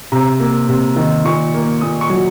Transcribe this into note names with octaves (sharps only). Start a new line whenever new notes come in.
C3 A#5
A#3
C3
D#3
A#2 C#6
A#3
A#2 D#6
C#6
F#3